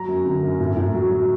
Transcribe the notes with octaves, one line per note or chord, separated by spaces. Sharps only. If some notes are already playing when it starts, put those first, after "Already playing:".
Already playing: F#3 A#5
F#2
D3
F#2
A2
A2
F#3
F#3